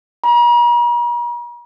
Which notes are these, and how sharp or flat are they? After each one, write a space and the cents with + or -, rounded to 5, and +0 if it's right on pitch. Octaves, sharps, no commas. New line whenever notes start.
A#5 +45